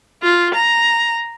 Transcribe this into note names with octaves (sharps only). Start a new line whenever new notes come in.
F4
A#5